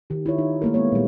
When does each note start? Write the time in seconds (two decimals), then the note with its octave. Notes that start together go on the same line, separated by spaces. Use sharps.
0.10 D#3 G4
0.26 E4 F4 C#5
0.38 D#4
0.62 A3 A#3 A#4
0.74 G#3 B3 C#5
0.92 A#2 G3